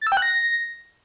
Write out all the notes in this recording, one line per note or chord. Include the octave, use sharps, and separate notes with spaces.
A6
E6
G5
F#6
A#6